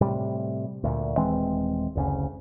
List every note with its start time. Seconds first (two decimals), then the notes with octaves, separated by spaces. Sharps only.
0.01 A2 C3 G3
0.84 D2 A#2
1.17 D#1 E3 G#3 C4
1.95 F#1 D2 C#3